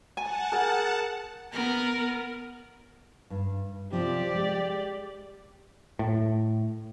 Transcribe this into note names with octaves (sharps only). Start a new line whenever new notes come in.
F#5 G#5 A5
G#4 A#4 G5
B3 A#4
G2
C3 F3 G4 D5
G#3
A2